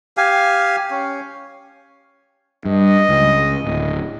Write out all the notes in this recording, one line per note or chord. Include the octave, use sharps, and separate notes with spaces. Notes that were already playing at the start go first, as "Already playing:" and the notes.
G4 F5 G#5
C#4
G2 D#5
C#2
D1